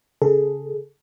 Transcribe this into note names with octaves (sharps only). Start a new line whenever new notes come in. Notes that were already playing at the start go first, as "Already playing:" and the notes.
C#3 G#4 A4